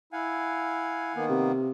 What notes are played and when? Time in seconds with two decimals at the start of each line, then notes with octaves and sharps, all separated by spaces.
0.13 E4 F5 F#5 G#5
1.15 D#3 A#3 B3
1.29 C3